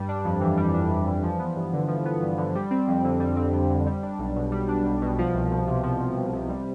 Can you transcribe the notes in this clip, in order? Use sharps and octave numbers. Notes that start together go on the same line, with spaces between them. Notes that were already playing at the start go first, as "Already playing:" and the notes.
Already playing: G2 G3
D4
F2
E3
G3
D4
F2
E3
F3
B3
G2
D3
F3
B3
G2
D3
G3
C4
F2
D3
G3
C4
F2
D3
G3
D4
B1
B2
G3
D4
B1
B2
F3
C2
C2
C3
F3
C2
C2
C3
G3